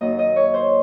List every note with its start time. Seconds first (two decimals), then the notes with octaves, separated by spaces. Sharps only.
0.01 F#2 D#3 A#3 D#5
0.19 D#5
0.36 C#5
0.54 C5